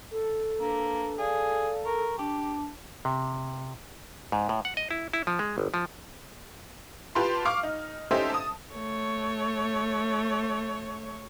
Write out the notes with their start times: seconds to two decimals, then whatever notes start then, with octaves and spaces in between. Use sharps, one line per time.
0.11 A4
0.60 A#3 D4 B4
1.18 G#4 D5 F5
1.85 A#4 C#6
2.18 D4 G4 A5
3.05 C3
4.32 G#2
4.49 A2
4.65 F#5
4.77 D#5
4.91 E4
5.13 E4
5.27 F3
5.39 G#3
5.58 G1
5.74 F3
7.15 F4 G4 B4 A5 C6
7.45 F5 C#6 D6 F6
7.63 D#4
8.11 C#4 D#4 G4 A4 C5 E5
8.30 A5 D#6
8.75 A3 C#5